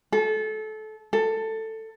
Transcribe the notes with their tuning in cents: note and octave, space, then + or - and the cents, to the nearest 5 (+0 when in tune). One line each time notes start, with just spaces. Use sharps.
A4 -25
A4 +15